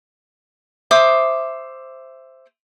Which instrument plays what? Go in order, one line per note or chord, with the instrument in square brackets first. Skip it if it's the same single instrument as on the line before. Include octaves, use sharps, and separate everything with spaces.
[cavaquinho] C5 E5 D6 D#6